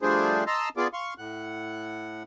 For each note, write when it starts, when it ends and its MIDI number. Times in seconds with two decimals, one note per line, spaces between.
0.02 0.44 53
0.02 0.44 55
0.02 0.44 57
0.02 0.44 62
0.02 0.44 68
0.02 0.44 72
0.47 0.69 75
0.47 0.69 81
0.47 0.69 82
0.47 0.69 84
0.47 0.69 88
0.77 0.88 59
0.77 0.88 65
0.77 0.88 68
0.77 0.88 74
0.93 1.14 77
0.93 1.14 84
0.93 1.14 85
1.18 2.23 45
1.18 2.23 78